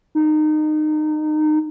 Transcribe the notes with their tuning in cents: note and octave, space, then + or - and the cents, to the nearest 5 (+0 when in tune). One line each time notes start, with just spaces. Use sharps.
D#4 -25